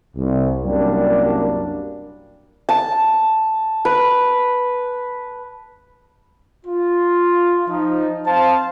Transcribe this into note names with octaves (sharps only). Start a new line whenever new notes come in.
C2
C2 F#2 G3 A#3 D4
A5
B4
F4
F3 D#4
C4 C5 F5 A5